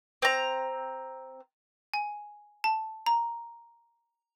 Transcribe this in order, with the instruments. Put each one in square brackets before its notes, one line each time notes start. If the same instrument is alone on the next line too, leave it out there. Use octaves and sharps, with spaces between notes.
[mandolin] C4 A#5
[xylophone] G#5
A5
A#5